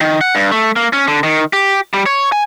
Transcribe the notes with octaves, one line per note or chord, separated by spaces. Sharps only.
D#3
F#5
G2
A3
A#3
C#4
D3
D#3
G4
G3
C#5
G#5